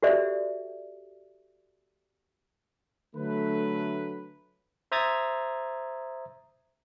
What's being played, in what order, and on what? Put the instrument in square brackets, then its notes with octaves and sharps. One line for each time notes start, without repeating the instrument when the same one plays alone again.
[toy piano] F#4 G4 A4 C5 D5 E5
[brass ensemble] D3 F#3 A3 B4
[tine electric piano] C5 E5 A#5 D#6 G#6 A6